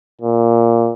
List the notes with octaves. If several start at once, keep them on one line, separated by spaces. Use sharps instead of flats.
A#2